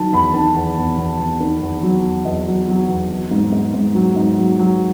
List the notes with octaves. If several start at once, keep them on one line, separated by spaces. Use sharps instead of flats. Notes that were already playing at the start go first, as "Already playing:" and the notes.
Already playing: D#3 F#3 A5
E2 B5
D#3 A5
E2
E2
E2
E2
D#3
E2
F#3
E2
E2 D#5
F#3
F#3
E2
F#3
G#2
G#2
G#2
F#3
G#2
F#3
F#3